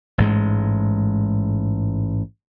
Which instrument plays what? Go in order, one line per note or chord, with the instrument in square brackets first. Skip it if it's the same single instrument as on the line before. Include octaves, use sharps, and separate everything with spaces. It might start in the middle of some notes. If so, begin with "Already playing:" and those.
[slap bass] A1 G#2 G#3